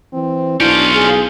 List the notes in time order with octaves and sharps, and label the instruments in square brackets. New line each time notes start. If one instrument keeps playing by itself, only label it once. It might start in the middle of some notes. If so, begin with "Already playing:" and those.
[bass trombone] E3 [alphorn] C4
[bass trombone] B1 [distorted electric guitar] C#4 F4 [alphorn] D4 [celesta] E4 G6 D7
[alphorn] G#4